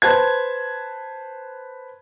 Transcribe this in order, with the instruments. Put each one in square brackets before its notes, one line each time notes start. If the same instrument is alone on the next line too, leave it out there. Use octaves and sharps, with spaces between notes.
[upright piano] B4 C5 A5 G#6